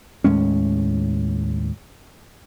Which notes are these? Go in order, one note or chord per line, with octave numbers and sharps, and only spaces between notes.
D#2 A2 G#3 C#4